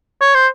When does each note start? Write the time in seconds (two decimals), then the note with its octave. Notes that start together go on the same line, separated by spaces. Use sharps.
0.21 C#5
0.35 C5